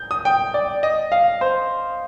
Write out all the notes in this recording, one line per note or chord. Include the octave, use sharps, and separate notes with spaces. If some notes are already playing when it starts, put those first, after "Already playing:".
Already playing: G6
D#6
G5
D5
D#5
F5
C5